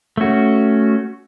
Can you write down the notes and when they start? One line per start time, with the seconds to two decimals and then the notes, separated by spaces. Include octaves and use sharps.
0.17 A3 C#4 F#4